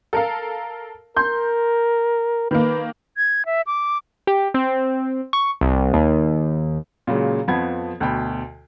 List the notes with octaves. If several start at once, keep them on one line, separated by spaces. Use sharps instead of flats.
A4 A#4 F5
A#4 C6 G6
D#3 A#3 B4
G#6
E5
D6
G4
C4
C#6
C2
D#2
A#2 C#3 F#3 G#3
F2 F3 B3 F#5 B5 G#6
D2 B2 G5 B5